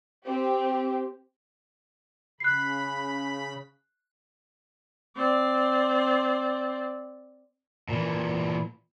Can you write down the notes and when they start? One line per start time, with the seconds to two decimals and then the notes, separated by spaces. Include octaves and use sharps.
0.24 C4 G4
2.40 C#3 B5 F#6 C7
5.16 C4 D5
7.89 A#2 E3